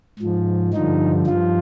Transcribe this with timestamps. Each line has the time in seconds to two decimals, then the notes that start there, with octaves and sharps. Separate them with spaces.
0.19 G#2 F3
0.73 G2 D3 F3 D#4
1.27 G2 F3 F4